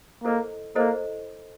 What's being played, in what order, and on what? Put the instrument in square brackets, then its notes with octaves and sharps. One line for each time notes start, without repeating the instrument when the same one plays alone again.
[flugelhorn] A#3 [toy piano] E4 A4 C5 D#5
[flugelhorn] A#3 [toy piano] E4 A4 C5 D#5